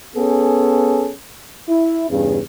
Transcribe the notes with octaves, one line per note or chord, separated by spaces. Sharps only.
B3 C#4 G#4 A4
E4
E2 G2 C#3